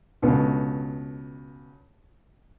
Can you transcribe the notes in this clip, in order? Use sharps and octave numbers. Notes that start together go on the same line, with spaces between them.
C#2 B2 D3